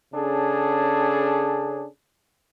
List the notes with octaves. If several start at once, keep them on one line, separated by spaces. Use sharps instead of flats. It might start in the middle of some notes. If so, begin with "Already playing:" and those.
C#3 C#4 D4 G#4 A4